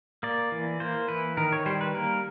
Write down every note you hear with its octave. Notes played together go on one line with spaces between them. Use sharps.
A#3 D5
E3
A#3 C5
E3 B4
D#3 A#4
C#5
G3 C5
B4
A#3 A#4